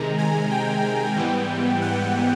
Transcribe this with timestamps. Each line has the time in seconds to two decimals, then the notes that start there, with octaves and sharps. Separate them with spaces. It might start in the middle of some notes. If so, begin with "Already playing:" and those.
Already playing: C3 D#3 G#3 A#5
0.18 G#5
0.51 G5
1.16 G#2 E3 G3 B3
1.82 F#5